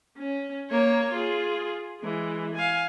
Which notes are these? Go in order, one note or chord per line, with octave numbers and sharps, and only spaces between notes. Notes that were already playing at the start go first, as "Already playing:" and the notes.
C#4
A#3 C#5
F4 G#4
E3 G#3
F5 G#5